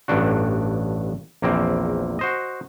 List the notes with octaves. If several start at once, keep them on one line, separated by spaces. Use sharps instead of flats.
A1 G2 D4 F#4
A#1 E2 A#3 C4
F#4 C5 D#5